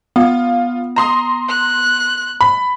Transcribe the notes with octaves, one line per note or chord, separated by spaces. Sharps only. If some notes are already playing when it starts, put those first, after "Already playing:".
B3 F4
A#5 C6 D#6
F#6
B5